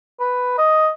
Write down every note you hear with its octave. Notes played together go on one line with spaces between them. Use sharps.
B4
D#5